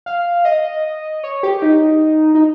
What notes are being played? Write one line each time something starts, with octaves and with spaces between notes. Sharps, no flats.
F5
D#5
C#5
G4
D#4
D#4